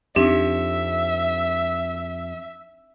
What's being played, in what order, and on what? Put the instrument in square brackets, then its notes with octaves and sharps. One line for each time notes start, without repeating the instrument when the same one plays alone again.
[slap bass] F2 [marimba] C4 D4 D#4 [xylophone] G4 [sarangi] E5